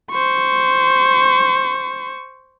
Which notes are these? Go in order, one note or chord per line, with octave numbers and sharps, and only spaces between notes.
C5 C#6